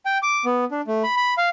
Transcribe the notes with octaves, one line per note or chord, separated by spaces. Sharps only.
G5
D6
B3
D4
A3
B5
B5
F5